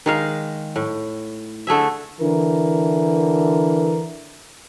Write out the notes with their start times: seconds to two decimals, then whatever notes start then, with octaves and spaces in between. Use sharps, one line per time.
0.06 D#3 G#3 F5
0.76 A2
1.67 D3 A3 G#4 E5
2.20 D3 E3 A#4